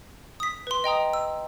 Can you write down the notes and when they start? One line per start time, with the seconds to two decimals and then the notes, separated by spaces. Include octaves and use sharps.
0.40 D#6 B6
0.67 B4 C6
0.84 D#5 G5 A#5 D#6
1.13 E6